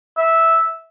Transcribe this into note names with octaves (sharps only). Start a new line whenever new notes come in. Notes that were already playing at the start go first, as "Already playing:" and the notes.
E5